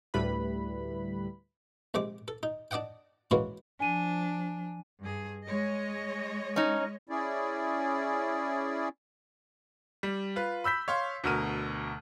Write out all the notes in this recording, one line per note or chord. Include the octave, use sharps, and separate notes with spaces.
D2 A2 G3 E4 B4 B5
A#1 C3 G#3 D6
A4
D#4
D4 D5 D#5 F#5 G5
E3 G#3 A#3 C#4 F#4 B4
F3 D4 G#5 D#7
G2 G#4
G#3 C#5 D#5
C#4 D#4
C#4 E4 G#4 D5
G3
F4 B4
B5 E6 G6 B6
C#5 F5 C6
D2 B2 A#4 F6 D#7